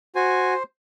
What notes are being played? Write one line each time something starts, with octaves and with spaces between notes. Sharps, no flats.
F#4 C5 G#5